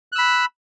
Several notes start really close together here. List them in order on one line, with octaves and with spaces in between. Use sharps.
F#6 E6 B5